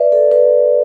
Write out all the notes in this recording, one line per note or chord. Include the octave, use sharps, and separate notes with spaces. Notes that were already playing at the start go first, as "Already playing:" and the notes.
Already playing: B4 D5 E5
A4
B4